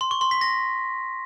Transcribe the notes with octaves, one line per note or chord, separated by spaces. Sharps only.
C6
C#6
C6
B6
A#6